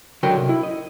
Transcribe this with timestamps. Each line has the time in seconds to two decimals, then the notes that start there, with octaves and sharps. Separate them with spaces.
0.23 C#2 D3 F#3 A#4 G5
0.37 C3
0.49 E4
0.63 D#5